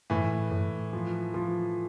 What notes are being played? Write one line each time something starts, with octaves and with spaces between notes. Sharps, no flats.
A2 E3
A2
F3
F3